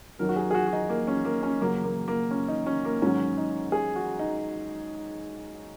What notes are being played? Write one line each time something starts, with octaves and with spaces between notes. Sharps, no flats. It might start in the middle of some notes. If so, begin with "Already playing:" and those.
F#2 D#3 F#3 A#4
F#4
G#4
G#4
F#4
F#4
D#4
A#3
C#4
A#3
C#4
F#2 C#3 F#3 A#3
A#3
A#3
C#4
D#4
C#4
A#3
G#2 D#3 F#3 C#4
D#4
G#4
F#4
D#4